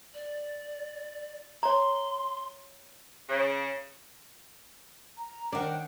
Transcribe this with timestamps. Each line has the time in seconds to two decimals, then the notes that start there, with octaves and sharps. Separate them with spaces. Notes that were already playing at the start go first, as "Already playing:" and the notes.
0.14 D5
1.63 C#5 A#5 C6
3.29 C#3
5.18 A#5
5.53 D#3 D4 F#5 F6